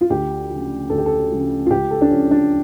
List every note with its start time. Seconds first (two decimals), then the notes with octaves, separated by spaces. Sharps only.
0.01 F4
0.10 D2 G4
0.50 C#3 F3
0.90 D2 A4
0.98 G4
1.06 A4
1.31 C#3 F3
1.66 F4
1.70 C#2 G4
1.91 A4
2.01 D4
2.11 C#3 F3 C#4
2.31 D4